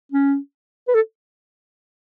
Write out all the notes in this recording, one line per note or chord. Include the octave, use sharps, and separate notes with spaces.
C#4
B4
A4